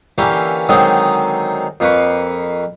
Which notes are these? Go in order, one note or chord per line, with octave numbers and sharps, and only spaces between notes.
D3 E3 A#3 C#4 G4
D3 D#3 F#3 G#3 C4 D#4
F2 A#3 B4 C#6